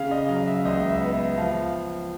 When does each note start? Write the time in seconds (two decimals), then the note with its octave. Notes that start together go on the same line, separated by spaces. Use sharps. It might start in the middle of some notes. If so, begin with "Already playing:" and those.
Already playing: C#3 F5
0.11 D#5
0.29 F#3 F5
0.47 E5
0.65 C#2 D#5
0.89 E5
1.01 B3
1.13 E5
1.37 F3 F5